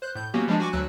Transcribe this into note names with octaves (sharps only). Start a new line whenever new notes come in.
C5 F#6 G6
A2 G6
F#3 A#3 B3 C#4 F#4 G4
F3 G3 G#3 D4
F#4 G#5 C#6 D6
D2 F#3 E6 F#6